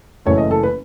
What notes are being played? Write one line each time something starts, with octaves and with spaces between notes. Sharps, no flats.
F#1 F#2 E3 A3 C#5
D#5
A4
B4